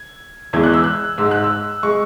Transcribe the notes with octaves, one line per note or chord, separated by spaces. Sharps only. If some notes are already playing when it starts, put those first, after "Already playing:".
Already playing: G#6
E2 E3 G#3 G#6
F#6
E6
F#6
G#2 G#3 E6
F#6
E6
G#3 C#6